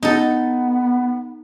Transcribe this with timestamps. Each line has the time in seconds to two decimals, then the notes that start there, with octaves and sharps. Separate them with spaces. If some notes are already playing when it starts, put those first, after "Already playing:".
0.03 B3 D#4 A4